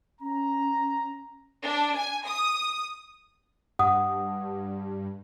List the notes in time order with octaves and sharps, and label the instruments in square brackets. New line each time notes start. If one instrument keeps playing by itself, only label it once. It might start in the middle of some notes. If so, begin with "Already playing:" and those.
[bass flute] C#4 [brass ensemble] A#5
[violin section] D4
G#5
D#6
[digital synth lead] G2 [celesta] F#5 D#6